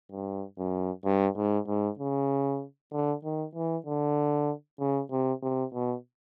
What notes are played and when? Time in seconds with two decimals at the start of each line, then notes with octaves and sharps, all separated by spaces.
0.12 G2
0.58 F#2
1.05 G2
1.37 G#2
1.68 G#2
1.99 C#3
2.92 D3
3.24 D#3
3.55 E3
3.86 D3
4.80 C#3
5.11 C3
5.42 C3
5.74 B2